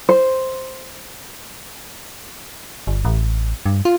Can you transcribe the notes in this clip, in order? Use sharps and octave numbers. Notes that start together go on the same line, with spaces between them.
C5
G1
A1
G2
F4